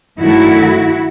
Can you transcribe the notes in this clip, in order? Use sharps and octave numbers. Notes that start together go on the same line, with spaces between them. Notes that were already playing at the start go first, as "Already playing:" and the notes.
G2 D#3 F#3 A3 E4 F#4